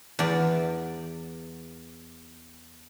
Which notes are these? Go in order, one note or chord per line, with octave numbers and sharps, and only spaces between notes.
E2 D5